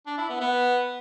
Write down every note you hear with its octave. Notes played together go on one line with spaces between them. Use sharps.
D4
E4
B3
B3